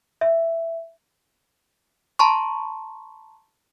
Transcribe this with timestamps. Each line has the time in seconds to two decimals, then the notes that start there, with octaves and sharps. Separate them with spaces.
0.21 E5
2.19 A5 A#5 C6 C#6